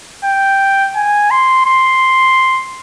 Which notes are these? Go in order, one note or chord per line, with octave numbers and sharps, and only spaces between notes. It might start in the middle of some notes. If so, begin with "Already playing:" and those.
G5
G#5
C6
C6